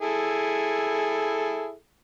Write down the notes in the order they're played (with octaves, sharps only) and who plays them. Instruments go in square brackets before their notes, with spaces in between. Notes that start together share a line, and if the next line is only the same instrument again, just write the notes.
[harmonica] E4 G#4 A4